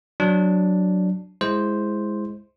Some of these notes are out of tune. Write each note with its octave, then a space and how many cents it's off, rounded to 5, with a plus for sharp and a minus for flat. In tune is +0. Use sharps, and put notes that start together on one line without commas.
F#3 +0 D4 +0
G#3 +0 E4 +0 C5 +0